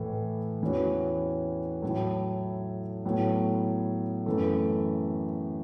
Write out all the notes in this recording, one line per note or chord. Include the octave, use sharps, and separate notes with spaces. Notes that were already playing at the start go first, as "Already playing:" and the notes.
Already playing: A2 E3 A3
E2 E3 C#4 F#4
A2 F#3 A3 E4
A2 F#3 B3 F#4
F#2 E3 A3